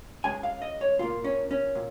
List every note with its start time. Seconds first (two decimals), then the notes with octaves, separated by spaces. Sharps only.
0.24 C#2 C#3 G#3 G#5
0.43 F5
0.62 D#5
0.81 C#5
0.99 A#2 A#3 F4
1.24 C#4
1.51 C#4
1.75 A#2